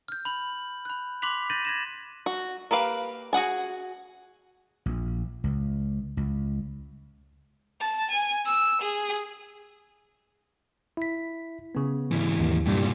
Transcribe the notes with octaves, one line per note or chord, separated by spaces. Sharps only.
F6 G6
B5 F#7
B5 F#6
B5 C6 D6 F#6 B6 F7
G6 A6 A#6 D#7 F#7
G#6 A#6 E7
F#4
A#3 G4 B4 F5
F#4 G#4 F#5 G#5
A#1
C#2
C#2
A5
G#5
E6
G#4
E4 B6
C#3 B3
G#2 E3
D#2
C2 G2 A#2 G3